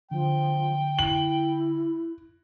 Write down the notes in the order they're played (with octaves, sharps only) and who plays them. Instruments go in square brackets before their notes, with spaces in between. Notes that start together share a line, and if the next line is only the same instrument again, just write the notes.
[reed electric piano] D3 [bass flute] F3 [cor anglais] G5
[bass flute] E4 [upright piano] F#7